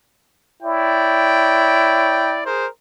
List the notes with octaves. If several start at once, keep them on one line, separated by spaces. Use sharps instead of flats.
E4 C#5 D5 G5
G#4 A#4 C5